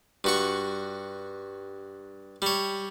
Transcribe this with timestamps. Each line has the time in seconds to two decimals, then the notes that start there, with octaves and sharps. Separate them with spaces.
0.24 G2 F#4 C#6
2.42 G3 C#5